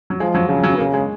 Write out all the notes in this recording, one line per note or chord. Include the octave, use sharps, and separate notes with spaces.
F#3
F3 G#3
F#3
C#3 F3
F#3
B3
C#3 A#3
G#3